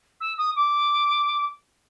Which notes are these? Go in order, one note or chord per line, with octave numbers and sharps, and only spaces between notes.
E6
D#6
D6